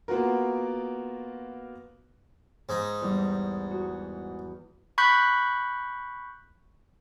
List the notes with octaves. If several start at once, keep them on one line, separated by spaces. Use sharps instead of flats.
A#3 B3 F4 F#4 A#4
G#2 D#4
E2 G3
F#4
B5 C#6 F#6 G6 B6 C#7